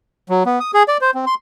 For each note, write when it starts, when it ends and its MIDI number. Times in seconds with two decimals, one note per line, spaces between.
0.29 0.43 54
0.46 0.59 59
0.60 0.71 87
0.74 0.83 68
0.88 0.97 74
1.01 1.11 72
1.14 1.25 60
1.26 1.35 84